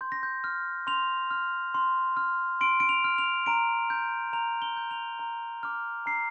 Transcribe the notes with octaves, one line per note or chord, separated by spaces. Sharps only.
C6 G6
A#6
G6
F6
C6 F7
F6
C6
F6
C6 D7
D7
F7
F6
F7
A#5 D7
G6
A#5 F7
G7
G6
F7
A#5
D6 F6
A#5 C7